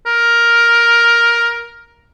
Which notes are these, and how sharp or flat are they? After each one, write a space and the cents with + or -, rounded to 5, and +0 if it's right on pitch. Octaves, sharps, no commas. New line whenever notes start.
A#4 +10